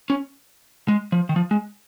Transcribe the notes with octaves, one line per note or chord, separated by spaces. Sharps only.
C#4
G#3
F3
D#3
F3
G#3